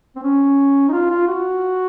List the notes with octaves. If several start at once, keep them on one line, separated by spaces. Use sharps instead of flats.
C4
C#4
D#4
F4
F4
F#4